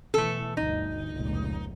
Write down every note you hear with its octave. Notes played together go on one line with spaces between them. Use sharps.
B2 E3 A3 A4
G1 D2 D#4
F1 C#2 A#2